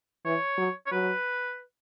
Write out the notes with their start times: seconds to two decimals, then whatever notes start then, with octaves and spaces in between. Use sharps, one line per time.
0.25 E3 C#5
0.58 F#3
0.86 C#5
0.92 F#3 B4